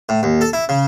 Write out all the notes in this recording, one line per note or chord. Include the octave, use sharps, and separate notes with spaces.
A2
D#2
A4
E4
C#3